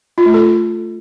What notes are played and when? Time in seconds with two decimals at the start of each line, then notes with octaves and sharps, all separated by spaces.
0.18 F4
0.26 A3
0.34 A4